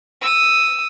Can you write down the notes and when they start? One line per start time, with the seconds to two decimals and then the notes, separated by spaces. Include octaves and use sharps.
0.22 D#6 E6